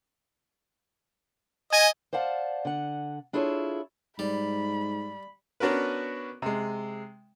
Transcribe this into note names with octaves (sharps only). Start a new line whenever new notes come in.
D#5 G#5
C5 D5 F5 F#5 A5
D3 F#5
D4 E4 F4 G#4 A4 C#5
G#2 G3 B5
B3 C#4 D4 F#4 A#4 B4
C3 G#3